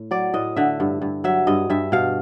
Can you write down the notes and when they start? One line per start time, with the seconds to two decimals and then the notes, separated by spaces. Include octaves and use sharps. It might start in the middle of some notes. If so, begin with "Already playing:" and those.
Already playing: A2
0.11 F#3 D5
0.34 A2 D#5
0.56 D3 E5
0.80 G2
1.02 G2
1.24 F#3 E5
1.47 G2 D#5
1.70 G2 E5
1.92 B2 F5